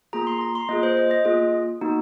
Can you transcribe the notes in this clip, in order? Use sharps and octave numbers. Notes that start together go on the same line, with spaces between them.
A#3 F4 G#4 A#5
C6
A#5
C6
A#3 F4 G#4 D#5
C5
D#5
D#5
A#3 F4 G#4
A#3 D#4 F#4